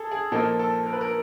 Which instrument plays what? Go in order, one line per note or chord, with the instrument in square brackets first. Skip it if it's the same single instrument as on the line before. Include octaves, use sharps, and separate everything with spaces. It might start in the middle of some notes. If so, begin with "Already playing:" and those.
Already playing: [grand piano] G#4 A4
G#4
A#2 F3 A#3 D#4 A4
A4
A#4
B4
A#4